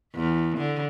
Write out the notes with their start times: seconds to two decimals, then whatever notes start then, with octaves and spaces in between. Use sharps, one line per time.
0.15 E2
0.58 D3